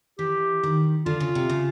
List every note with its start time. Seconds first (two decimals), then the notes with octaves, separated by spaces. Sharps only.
0.19 E3 G4
0.63 D#3
1.06 D3 F4
1.20 C#3
1.35 C3
1.49 C#3